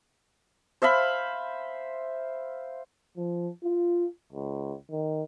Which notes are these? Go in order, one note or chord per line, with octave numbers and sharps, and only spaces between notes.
C5 E5 F5 B5
F3
F4
C#2
D#3